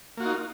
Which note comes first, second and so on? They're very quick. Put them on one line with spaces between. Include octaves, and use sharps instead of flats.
A#3 F#4 F4 D#4